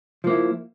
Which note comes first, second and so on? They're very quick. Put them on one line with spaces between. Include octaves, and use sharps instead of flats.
F3 A#3 E4